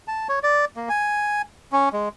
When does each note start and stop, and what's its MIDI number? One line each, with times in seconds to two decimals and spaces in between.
0.08 0.28 81
0.29 0.39 73
0.43 0.65 74
0.77 0.89 58
0.89 1.42 80
1.72 1.89 61
1.93 2.09 56